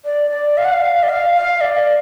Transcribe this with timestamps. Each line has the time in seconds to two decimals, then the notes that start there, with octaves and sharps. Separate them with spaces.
0.05 D5
0.31 D5
0.57 F5
0.65 F#5
0.72 F5
1.03 D5
1.09 F5
1.35 F5
1.61 D5